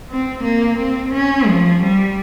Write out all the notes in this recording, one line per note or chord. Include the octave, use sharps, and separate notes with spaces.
C4
A#3
C4
C#4
F3
G3